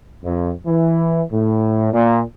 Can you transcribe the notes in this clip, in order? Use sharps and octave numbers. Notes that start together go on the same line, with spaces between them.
F2
E3
A2
A#2